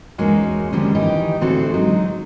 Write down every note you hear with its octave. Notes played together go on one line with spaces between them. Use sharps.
E2 G#3 A#3 C#4 D#4 F#4
D3 D#3 F3 G3 G#3 C4
D#3 E3 D#4 G4
A2 D3 C4 F#4 A4
F#3 G#3 D#4